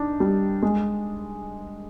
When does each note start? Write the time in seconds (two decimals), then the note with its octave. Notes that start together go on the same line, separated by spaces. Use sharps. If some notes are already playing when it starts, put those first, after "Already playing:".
Already playing: D4 D#4
0.20 G3
0.62 G#3